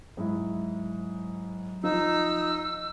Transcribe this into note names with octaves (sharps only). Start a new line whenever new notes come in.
G#2 F#3 E4
F3 D#4 E6